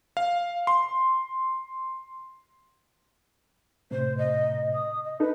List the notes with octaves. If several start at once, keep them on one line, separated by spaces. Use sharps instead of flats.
F5
C6
A2 C3 C5
D#5
D#6
D#5
D4 D#4 A4 B4